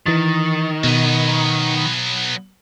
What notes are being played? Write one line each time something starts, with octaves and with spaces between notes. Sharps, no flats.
D#3 E3 A6
B2 F#3 B3